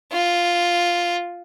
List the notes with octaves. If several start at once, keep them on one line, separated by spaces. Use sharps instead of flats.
F4